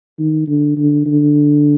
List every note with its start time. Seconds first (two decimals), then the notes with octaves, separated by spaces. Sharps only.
0.19 D#3
0.48 D3
0.77 D3
1.06 D3